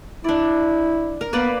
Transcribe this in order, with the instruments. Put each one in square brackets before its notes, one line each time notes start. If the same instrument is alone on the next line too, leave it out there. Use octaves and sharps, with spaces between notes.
[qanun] D4 D5 [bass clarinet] E4
[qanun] A#4
[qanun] A#3 B4 D5 [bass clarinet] B3